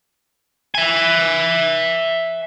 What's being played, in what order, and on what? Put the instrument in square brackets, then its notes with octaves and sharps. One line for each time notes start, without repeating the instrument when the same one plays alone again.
[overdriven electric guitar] E5 G#5